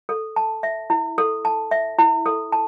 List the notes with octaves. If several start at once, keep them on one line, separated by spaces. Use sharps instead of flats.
A4
A5
E5
E4
A4
A5
E5
E4
A4
A5